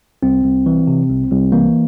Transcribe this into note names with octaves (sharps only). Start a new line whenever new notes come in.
C2 C4
C2
E3
C3
C2
C2
E3 A#3